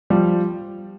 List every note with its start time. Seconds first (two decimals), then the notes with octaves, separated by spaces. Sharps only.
0.10 F3 G3